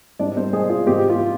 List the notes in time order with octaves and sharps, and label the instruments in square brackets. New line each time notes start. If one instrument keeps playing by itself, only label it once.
[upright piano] G#2 G3 C4 D4 D#4 D5
C4 C5
G#3 G#4
F4
G#2 F3 C4 G4
F4